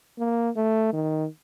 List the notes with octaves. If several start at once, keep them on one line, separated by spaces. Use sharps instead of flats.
A#3
A3
D#3